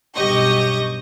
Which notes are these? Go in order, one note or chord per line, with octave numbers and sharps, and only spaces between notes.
B1 G2 G4 D#5 C#6 A#6